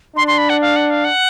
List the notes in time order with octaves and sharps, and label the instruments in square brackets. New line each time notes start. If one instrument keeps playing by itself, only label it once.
[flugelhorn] D4 [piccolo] C6
[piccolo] C6
B5
F#5
F5
F#5
F5
F#5